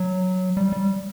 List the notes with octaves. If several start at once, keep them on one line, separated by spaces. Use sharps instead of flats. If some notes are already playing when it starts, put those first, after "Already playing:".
Already playing: F#3
G3
G3